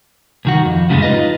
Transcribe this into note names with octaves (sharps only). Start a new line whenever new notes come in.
C2 D#3 F#4
F2
F#2 A2 C#3 F3 G3 G#3
D#4 F4 B4 D#5